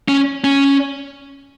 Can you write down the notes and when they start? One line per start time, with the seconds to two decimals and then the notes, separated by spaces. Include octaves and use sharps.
0.08 C#4
0.44 C#4